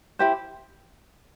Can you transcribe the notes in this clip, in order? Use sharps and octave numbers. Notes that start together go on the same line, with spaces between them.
E4 G4 C5